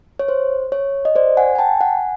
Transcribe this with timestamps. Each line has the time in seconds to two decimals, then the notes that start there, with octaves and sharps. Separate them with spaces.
0.19 C#5
0.28 C5
0.72 C#5
1.05 D#5
1.15 C5 D5
1.37 F#5 G#5
1.55 G#5
1.59 G5 A5
1.81 F#5 G#5